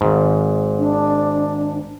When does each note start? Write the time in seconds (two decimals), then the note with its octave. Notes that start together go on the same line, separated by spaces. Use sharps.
0.01 G#1 G#2
0.79 D4